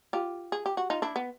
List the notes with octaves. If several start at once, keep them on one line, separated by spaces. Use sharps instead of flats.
F4 G4
G#4
G4
F#4
D#4 F4
D4 E4
B3